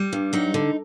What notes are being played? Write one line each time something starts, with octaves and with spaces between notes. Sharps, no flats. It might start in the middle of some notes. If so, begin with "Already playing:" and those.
Already playing: G3
G2
F#3 D#4
D3